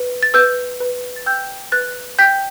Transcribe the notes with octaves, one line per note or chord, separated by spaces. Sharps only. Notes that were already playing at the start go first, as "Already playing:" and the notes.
Already playing: B4
A6
B4 E6 G6
B4
A6
G5 E6 G6
B4 F#6 A6
G5 G6 B6